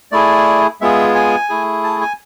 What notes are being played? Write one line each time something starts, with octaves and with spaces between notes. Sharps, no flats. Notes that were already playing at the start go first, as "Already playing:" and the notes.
A3 E4 G#4 D5
G#3 B3 F4 G#4 E5
G#5
A3 E4 G#4
A5
G#5